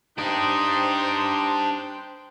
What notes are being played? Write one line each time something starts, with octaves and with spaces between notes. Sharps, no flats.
D4 D#4 G4 C5 G5